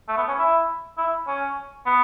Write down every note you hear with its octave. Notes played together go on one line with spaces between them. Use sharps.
A3
B3
C#4
E4
E4
C#4
B3